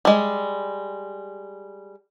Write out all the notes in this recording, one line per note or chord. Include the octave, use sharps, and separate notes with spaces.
G3 G#3